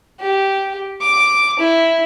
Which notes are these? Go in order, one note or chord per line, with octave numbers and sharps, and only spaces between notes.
G4
D6
E4